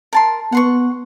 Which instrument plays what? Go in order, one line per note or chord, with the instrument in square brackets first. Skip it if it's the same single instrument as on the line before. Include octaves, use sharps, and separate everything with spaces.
[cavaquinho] A#4 A5 C6
[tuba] B3 [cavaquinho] F#5 C6 C#6